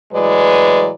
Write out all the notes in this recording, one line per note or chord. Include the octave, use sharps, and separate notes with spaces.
A2 E3 F#3 G#3 B4 D5